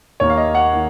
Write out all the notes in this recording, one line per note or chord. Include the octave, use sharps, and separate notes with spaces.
D#2 D#3 A#3 C#5
F5
D#5
F#5
D#3 A#3